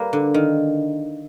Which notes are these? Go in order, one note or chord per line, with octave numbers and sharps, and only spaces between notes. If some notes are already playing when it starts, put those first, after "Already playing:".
Already playing: G3 A#3 B4
D3
D#3